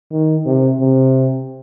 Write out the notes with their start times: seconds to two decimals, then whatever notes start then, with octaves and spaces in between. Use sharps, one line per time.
0.12 D#3
0.46 C3
0.80 C3